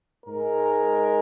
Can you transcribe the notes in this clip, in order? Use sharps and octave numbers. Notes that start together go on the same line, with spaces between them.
G#2 G#3 A#4